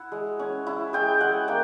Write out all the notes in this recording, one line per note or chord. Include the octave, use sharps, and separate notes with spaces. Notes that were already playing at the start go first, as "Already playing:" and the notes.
Already playing: E4 F#5
G#3
C#4
E4
G#3 G5
G#3 F#5
A#3 G5